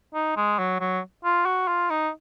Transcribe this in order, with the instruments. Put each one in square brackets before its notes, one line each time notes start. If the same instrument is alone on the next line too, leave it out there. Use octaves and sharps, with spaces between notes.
[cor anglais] D#4
G#3
F#3
F#3
F4
F#4
F4
D#4